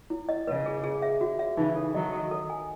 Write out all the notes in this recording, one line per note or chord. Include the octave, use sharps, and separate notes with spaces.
E4
D#5
C#3 B4
G#4
G#4
E5
F#4
E5
C#3 E3 D#4
A4
D#3 F#3 D#5
A4
A4
G#5